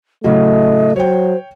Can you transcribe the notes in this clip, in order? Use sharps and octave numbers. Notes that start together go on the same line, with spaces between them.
A2 C#3 F#3 A3 D#5
F#3 C5 C#5 G5